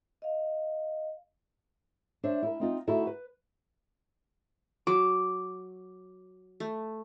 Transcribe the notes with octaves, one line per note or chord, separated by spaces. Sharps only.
D#5 F5
D4 C5 C#5 E5
E4 A#4
C4 D#4 F4
D2 D#4 E4 F#4 A4 F#5
B4
F#3 D6
A3